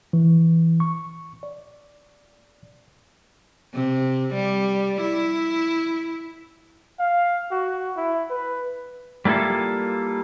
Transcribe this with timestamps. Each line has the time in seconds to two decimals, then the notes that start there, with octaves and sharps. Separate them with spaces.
0.13 E3
0.80 C#6
1.43 D5
3.74 C3
4.34 G3
5.01 E4
6.99 F5
7.51 F#4
7.97 E4
8.30 B4
9.25 G3 A#3 E4 F4 A4